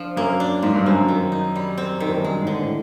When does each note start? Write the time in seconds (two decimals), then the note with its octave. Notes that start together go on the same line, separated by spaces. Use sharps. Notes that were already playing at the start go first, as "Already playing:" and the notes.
Already playing: F3 D4
0.17 F#2 A#3
0.40 D4
0.62 G#2 F3
0.75 G2
0.86 F#2 C4
1.08 D#3
1.32 D#4
1.56 G3
1.78 C4
2.00 D#3
2.09 F2
2.17 F#2
2.24 G2 G#3
2.42 G#2
2.47 D3
2.58 A2